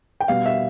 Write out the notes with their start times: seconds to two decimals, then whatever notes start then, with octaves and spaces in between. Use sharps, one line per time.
0.20 G5
0.28 B2 G3 B3 F5
0.46 E5